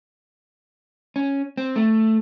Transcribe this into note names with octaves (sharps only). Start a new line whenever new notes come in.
C#4
C4
A3